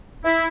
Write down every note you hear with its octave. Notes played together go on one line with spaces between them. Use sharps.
E4